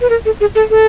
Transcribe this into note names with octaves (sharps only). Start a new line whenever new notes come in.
B4
A#4
A4
G#4
A4
A4